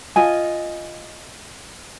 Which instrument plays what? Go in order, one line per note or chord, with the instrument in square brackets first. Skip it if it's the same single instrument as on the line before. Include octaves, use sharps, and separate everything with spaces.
[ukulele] F4 D#5 G#5